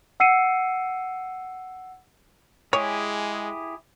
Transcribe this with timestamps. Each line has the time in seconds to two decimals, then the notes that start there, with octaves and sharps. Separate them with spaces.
0.20 F#5 E6 C7 C#7 D#7
2.73 G#3 E4 G4 G#4 C#5